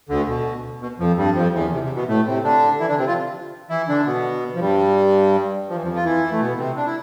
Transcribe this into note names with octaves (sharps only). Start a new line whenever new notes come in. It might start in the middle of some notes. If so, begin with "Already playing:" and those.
D2 D3
B2
B2
F2 F3
G2 G3
F2 F3
E2 E3
C3
C3
B2 B3
A2 A3
C3 C4
D3 D4
E3 E4
D3 D4
C3 C4
F3 F4
E3 E4
D3 D4
B2 B3
F3
G2 G3
F3
E3
F2 F3
F4
E3 E4
A3
B2 B3
C3 C4
D4
E4